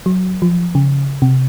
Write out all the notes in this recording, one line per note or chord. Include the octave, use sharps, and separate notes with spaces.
F#3
F3
C#3
C3